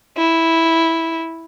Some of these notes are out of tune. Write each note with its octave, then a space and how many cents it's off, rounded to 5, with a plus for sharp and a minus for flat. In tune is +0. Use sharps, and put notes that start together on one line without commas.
E4 -5